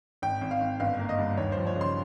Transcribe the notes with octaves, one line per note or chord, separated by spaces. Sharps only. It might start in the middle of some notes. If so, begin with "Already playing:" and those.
G#1 G5
G#1
F5
G#1
G1 F5
A#3
D#5
G2
D#2 C#5
F3 C5
C#5
C#3 C6